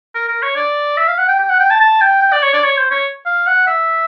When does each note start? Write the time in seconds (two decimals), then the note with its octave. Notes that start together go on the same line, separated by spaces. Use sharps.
0.14 A#4
0.28 A#4
0.42 C#5
0.56 D5
0.97 E5
1.08 F5
1.18 F#5
1.28 G5
1.39 G5
1.49 F#5
1.60 G5
1.70 A5
1.80 A5
2.01 G5
2.21 G5
2.32 D5
2.43 C#5
2.53 D5
2.63 C#5
2.77 C5
2.91 C#5
3.26 F5
3.47 F#5
3.67 E5